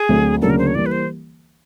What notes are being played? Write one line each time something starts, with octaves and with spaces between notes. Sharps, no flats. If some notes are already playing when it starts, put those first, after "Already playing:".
Already playing: G#4
D2 D3 F#3 A3 C4
D2 C#3 F#3 A#3 D4 A4
A#4
C5
C#5
E3 G3 A#3 D5
B4
C5